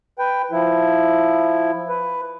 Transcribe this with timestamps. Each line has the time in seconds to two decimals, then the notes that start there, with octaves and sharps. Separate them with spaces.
0.19 B4 G5
0.51 F3 E4
1.89 B4